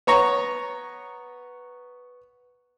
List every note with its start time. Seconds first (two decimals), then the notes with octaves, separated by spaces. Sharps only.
0.07 B3 C#5 A#5 C#6